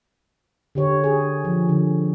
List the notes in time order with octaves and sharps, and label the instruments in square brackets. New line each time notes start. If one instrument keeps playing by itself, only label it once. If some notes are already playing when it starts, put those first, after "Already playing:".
[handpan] D3 G4 C#5
G#4
F3
D3